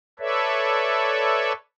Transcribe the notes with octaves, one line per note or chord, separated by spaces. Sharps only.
A4 B4 C#5 D5 E5